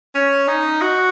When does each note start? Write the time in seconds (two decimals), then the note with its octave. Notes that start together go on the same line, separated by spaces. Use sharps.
0.15 C#4
0.48 D#4
0.81 F#4